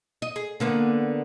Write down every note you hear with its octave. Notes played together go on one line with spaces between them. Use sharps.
D#5
G#4
D3 A#3 B3